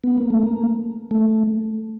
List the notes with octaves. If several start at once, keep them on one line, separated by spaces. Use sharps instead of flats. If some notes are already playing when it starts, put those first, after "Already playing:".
B3
A#3
A3
A#3
A3